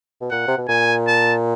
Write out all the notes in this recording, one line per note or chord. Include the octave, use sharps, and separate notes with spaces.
B2
A#2 F#5
C3
B2
A#2 G#5
A5